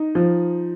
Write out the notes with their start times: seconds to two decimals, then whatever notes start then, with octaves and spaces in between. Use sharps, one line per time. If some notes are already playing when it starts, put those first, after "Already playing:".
Already playing: D#4
0.15 F3